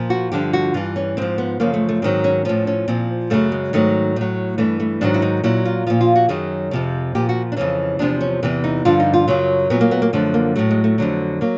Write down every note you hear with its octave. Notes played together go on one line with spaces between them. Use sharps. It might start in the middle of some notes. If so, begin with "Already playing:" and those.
Already playing: A#2 F3
F#4
G2 D3 F3 G4
F#4
G2 E3 F4
C#4
G#2 F3 C4
B3
F#2 C#3 F3 A#3
A3
A3
G#2 D#3 F#3 C4
C#4
A2 F3 C#4
C#4
A#2 F3 C4
F#2 C#3 F#3 A3
G#3
G#2 D#3 F#3 A3
A2 F#3
G2 E3 A3
A3
G#2 D#3 F#3 D4
E4
D#4
A#2 F#3 E4
F4
A#2 F3 F4
F4
F#4
F#2 D#3 F#3 G#4
F2 C3 F3
A#2 F3 G4
F#4
D4
F2 C#3 E3 C#4
E2 C3 F3 D4
C#4
E2 C3 E3
D#4
G2 D3 F3 F4
D#4
F4
F#2 C#3 F#3
A#2 F#3 B3
A#3
B3
A#3
F#2 D3 F3 A3
A#3
A2 F#3 A3
G#3
A3
F2 D3 F#3
F#3 A#3